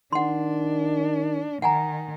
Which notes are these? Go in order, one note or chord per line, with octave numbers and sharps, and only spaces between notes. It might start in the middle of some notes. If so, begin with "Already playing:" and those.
D#3 D4 F#5 C6
D#3 F#5 G#5 A#5